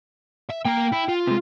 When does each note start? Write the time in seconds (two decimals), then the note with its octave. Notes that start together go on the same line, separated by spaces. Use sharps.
0.49 E5
0.65 A#3 G5 A#5
0.92 E4
1.08 F4
1.27 C3 G#3